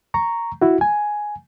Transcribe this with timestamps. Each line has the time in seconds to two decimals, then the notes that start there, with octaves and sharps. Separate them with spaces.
0.14 A#5 C#6
0.62 E4 F#4
0.81 G#5